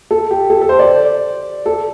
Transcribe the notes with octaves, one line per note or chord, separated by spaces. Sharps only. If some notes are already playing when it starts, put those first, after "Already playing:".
A4
G4
A4
A4
C5
D5
A4